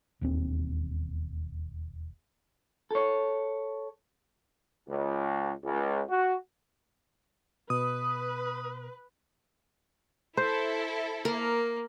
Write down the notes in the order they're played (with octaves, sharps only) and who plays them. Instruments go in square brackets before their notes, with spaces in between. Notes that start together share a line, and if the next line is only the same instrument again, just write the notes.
[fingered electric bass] E1 D#2 C4
[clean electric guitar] A4 C#5
[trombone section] C#2
C#2
F#4
[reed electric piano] B2 [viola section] B4 [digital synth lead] D#6
[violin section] E4 A4 [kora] C5
[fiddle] A#3 [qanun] A#4